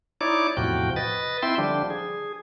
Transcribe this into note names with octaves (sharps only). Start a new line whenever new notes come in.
D#4 E4 C#5 D5 D6
E2 A2 C3 F3 F#4 G5
B4 D#5 A6
C4 E4 E5 G5 C6
D3 F3 G3 D4
G#4